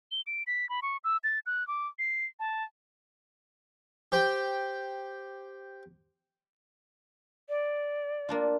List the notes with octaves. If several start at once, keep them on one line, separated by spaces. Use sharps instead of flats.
G7
D7
B6
B5
C#6
E6
A6
F#6
D6
C7
A5
G4 C5 G5
D5
A#3 D4 F4